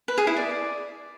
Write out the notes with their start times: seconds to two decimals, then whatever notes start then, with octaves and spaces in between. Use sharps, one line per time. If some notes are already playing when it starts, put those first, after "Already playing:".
0.08 B4
0.18 G#4
0.27 E4
0.36 D5